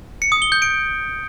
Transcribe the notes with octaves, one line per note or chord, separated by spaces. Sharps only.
C#7
D#6
G7
G6
D7